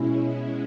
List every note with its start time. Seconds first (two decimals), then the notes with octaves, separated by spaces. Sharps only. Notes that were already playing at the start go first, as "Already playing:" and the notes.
Already playing: B2 G#3 C#4 E4